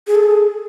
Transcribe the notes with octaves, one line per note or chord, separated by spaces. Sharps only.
G#4
A4
G#4